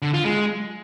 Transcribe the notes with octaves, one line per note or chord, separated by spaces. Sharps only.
D3
F4
G#3